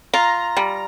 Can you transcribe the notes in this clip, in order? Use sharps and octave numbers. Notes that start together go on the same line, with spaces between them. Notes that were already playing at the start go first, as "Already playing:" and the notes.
F4 A#5
G3